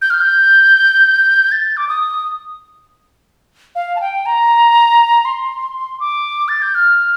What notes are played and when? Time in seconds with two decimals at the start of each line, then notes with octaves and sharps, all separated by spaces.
0.01 G6
0.10 F6
0.21 G6
1.52 A6
1.77 D6
1.88 D#6
3.75 F5
3.96 A5
4.01 G5
4.26 A#5
5.25 C6
6.00 D6
6.48 A6
6.62 G6
6.75 F6